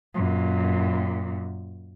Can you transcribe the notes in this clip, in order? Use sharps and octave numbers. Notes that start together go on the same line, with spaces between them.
F#2 A#2